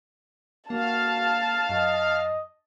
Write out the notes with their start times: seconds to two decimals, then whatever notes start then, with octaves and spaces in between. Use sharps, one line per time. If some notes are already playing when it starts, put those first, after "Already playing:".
0.70 A#3 F#4 F5 A5
1.69 F#2 D#5